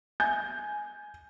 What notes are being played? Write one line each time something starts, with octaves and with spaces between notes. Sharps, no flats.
G#5 G6